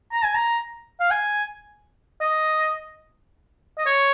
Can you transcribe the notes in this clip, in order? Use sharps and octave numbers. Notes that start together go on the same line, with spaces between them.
A#5
G#5
A#5
F5
G#5
D#5
D#5
C#5